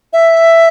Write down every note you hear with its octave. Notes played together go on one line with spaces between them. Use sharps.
E5